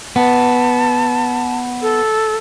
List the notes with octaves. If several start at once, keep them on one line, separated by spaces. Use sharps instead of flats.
B3 A5
A4